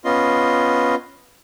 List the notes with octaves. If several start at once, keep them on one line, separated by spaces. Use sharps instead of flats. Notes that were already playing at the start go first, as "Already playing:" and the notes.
B3 C#4 F4 D#5 C6